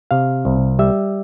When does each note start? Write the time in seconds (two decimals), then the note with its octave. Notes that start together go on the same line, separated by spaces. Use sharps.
0.11 C3 F5
0.45 C2
0.79 G3 E5